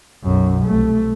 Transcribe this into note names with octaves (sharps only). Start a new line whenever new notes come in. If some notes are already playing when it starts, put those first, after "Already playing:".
B1 F#2
C2 A3